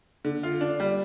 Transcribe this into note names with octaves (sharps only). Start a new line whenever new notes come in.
D3
F4
D4
G3